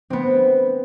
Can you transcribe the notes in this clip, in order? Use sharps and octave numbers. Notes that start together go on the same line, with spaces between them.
B3 C4